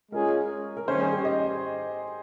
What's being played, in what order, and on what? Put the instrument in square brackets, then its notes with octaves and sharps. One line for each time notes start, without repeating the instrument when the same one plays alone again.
[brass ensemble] G#3 C#4 F4 G#4 [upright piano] A#4
[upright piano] A#4
[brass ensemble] D#3 G3 C#4 [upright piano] C5
[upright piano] G#4
G4
D#5